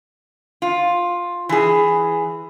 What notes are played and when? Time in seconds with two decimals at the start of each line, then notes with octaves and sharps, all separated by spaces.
0.62 F4
1.49 E3 G#4